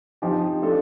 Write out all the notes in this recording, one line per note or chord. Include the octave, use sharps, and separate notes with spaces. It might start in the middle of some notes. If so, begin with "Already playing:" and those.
F3 C4 D#4 G4
A3 D4 F4 A4